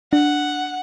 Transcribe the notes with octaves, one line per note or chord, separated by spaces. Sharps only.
D4 F#5